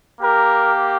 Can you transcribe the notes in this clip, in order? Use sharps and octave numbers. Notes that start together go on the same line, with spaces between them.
A#3 G4 A#4